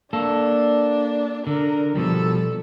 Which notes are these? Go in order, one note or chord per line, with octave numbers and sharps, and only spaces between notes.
A#3 D4 A4
D3 A#4
B2 F3 G3 A4